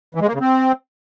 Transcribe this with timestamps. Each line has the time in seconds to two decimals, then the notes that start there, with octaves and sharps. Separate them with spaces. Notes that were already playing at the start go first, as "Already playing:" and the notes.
0.15 E3
0.21 G#3
0.28 A#3
0.34 C#3
0.41 C4